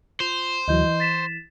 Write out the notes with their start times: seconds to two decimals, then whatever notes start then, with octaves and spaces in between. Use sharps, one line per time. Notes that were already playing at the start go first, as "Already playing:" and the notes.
0.20 F4 C5 F7 G7
0.68 D2 E3 F#3 D#5 G6
0.84 E3
1.00 A6 B6 E7